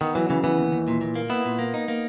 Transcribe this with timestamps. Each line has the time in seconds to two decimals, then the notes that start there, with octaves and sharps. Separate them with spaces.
0.01 D#3 B3
0.15 E3 F#3
0.30 C#3 E3
0.44 E3 B3
0.58 D#2
0.72 D#2
0.88 A#2
1.01 A#2
1.15 A#3
1.30 B3 E4
1.45 A#2
1.59 A#3
1.74 D#4
1.88 A#3